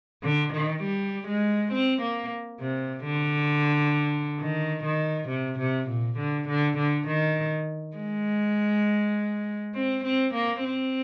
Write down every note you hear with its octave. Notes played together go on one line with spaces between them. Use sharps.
D3
D#3
G3
G#3
C4
A#3
C3
D3
D#3
D#3
C3
C3
A#2
D3
D3
D3
D#3
G#3
C4
C4
A#3
C4